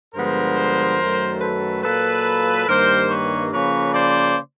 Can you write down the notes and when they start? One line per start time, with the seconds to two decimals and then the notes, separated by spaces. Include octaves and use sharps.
0.15 G2 D3 F3 G#3 B3 A#4 C5
1.00 F#2 D#3 F#3 A3
1.41 A4 B4
1.84 A#2 F#3 A#3 A4 B4
2.67 G2 D#3 G3 A#3 A#4 C5
3.10 B4 C#5
3.52 C#3 F3 A#3 B4 C#5
3.94 C5 D5